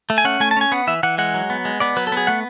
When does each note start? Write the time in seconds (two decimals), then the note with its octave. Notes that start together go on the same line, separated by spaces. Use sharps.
0.10 A3
0.18 G#5
0.25 C#4 F#5
0.40 A3 G#5
0.51 A5
0.57 C#4 G#5
0.72 B3 F#5
0.87 E3 E5
1.03 E3 F#5
1.18 G#3 F#5
1.34 F#3
1.50 B3
1.65 G#3
1.80 B3 D5
1.97 F#3 B4
2.07 A4
2.12 B3 G#4
2.27 A3 F#5